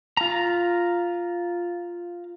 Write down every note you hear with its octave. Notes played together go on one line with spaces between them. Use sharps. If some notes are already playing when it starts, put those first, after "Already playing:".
F4 A#5